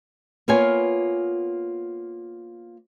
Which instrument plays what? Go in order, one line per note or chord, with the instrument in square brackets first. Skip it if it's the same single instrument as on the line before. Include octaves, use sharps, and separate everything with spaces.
[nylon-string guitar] A#3 B3 F4 C#5 G#5